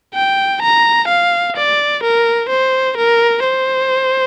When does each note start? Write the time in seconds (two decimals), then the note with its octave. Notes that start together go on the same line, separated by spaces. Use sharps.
0.15 G5
0.62 A#5
1.08 F5
1.56 D5
2.03 A#4
2.49 C5
2.98 A#4
3.44 C5